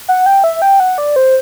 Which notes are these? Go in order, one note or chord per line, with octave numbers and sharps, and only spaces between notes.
F#5
G5
E5
G5
F#5
D5
C5